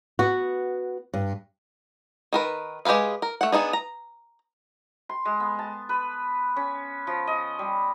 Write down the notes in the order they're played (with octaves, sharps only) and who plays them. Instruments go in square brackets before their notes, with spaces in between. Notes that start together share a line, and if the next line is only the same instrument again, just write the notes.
[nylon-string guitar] B3 F#4
G2
[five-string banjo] D#3 A#4 B4
G#3 G4 G#4 B4 F5
A#4
A3 F#5
B3 D4 D#4 G#4
A#5
[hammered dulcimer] C6
G#3
B3
A5
B4
C#4
F3
D#5
G3